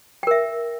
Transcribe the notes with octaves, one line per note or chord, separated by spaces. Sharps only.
A#4 E5 G5